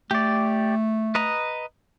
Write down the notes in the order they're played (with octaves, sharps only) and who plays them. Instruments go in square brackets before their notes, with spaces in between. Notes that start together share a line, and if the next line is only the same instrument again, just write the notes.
[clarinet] A3 [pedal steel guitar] G4 D5
[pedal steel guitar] B4 D#5 A#5